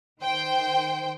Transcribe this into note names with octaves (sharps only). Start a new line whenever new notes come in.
D#3 C5 G5